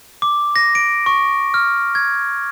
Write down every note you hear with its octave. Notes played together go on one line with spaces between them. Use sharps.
D6
A#6
D7
C#6
F6
G#6